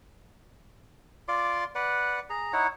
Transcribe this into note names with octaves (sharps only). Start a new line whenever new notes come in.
F4 D5 C6 D6
B4 D5 F#5
G#4 A#5
D#4 E4 C#5 F#5